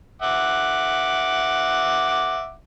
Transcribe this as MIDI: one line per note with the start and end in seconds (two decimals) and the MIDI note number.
0.22 2.52 76
0.22 2.52 78
0.22 2.52 86